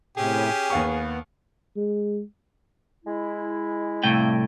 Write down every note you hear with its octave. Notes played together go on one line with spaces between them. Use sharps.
A2 C3 C#4 G4 G#4
D#2 B3 F5 C#6
G#3
G#3 E4
C2 A2 A3 A#3 C4 G5